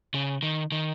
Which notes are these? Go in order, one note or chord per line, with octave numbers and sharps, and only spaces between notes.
C#3
D#3
D#3